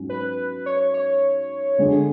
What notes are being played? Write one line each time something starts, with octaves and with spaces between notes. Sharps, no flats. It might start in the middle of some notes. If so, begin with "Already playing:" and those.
Already playing: G#2 F#3 C#4
B4
C#5
C#5
D3 G#3 D4 G#4